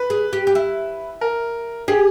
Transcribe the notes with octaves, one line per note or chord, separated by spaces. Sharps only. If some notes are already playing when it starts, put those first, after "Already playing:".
Already playing: B4
G#4
G4
G4
E4
A#4
G4 G#4